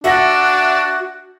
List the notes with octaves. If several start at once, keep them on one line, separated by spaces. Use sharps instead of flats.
D4 F#4 E5 F#5 A#6